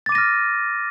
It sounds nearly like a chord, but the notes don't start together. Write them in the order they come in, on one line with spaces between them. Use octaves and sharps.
A6 D6 D#7 A#6 F6